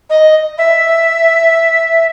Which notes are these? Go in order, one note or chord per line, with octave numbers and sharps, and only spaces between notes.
D#5
E5